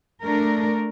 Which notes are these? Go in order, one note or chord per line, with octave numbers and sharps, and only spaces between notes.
A3 D4 A#4